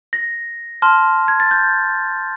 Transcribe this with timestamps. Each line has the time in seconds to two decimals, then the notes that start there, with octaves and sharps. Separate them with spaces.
0.13 A#6
0.82 A5 C6 F6
1.28 G#6
1.40 A6
1.51 G6